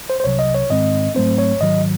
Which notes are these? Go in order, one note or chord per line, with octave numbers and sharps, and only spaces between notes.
C5
C5
C2 C3 F#3 C#5
D#5
C#5
G#2 D#3 G#3 C4 D#5
G#2 F#3 A3 C4 C5
C#5
G#2 D#3 F#3 D#5